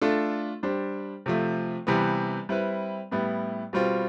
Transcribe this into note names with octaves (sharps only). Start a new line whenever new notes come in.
A3 D4 F4 A4
G3 D4 G4 C5
C3 F3 A3
C3 E3 G3 B3
G3 C4 E4 B4
A2 G3 B3 E4
B2 G3 C4 F4